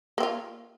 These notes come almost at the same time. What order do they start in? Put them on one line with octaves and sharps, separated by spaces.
A#3 C4 F4